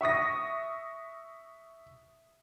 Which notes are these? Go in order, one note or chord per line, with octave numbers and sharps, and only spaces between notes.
E5 C#6 D#6 A#6